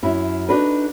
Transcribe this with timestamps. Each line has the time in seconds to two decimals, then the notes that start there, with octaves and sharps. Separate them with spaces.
0.03 F#2 E4
0.49 D4 D#4 F#4 A4 B4